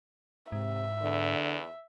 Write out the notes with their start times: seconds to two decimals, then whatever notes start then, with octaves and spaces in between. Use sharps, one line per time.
0.52 G#2 C3 E5
1.02 E2 D3